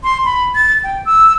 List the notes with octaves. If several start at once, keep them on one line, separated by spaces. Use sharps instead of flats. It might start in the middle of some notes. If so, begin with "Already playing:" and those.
C6
B5
A6
G5
E6